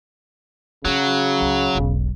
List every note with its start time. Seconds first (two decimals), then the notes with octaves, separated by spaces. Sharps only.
0.85 C#3 F#3 C#4
1.41 C#2
1.75 E1 B1